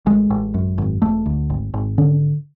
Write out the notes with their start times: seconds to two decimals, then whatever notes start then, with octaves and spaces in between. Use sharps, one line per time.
0.06 A1 G#3
0.30 A1
0.54 F#2
0.78 G#1
1.02 E1 A3
1.26 D2
1.50 G#1
1.74 G#1
1.98 D3 C#4